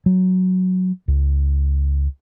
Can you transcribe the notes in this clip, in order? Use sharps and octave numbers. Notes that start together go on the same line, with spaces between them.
F#3
C#2